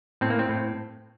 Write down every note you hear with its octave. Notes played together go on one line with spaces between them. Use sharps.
A2 C4
A#3
C4
A2